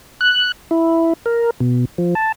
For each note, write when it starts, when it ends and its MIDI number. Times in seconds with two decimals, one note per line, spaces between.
0.21 0.52 90
0.71 1.13 64
1.26 1.50 70
1.60 1.85 47
1.98 2.14 53
2.15 2.32 81